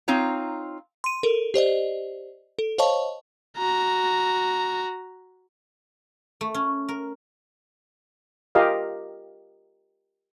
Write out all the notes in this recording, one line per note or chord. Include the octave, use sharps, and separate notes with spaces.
C4 D#4 F4 C#5 A#5
C6 D#7
A4 A#4
G4 C5 D5 D#5
A4
C5 C#5 D#5 F5 A5 C#6
F#4 A#5
A3
C#4
A#4
F4 G4 A#4 D#5 F5